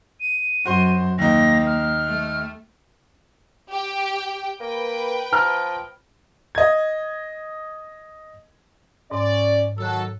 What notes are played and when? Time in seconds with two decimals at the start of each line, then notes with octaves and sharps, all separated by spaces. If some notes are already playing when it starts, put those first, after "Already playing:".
0.20 D#7
0.66 F#2 F#4 C5 C6
1.18 D#2 A#3 D#4 A#6
1.67 F6
2.06 A3
3.70 G4 G5
4.60 A#3 B4 G5
5.32 F3 A#5 F6
6.55 D#5 G#6
9.11 G#2 C#4 D5
9.78 D#3 F#3 A4 E6 F#6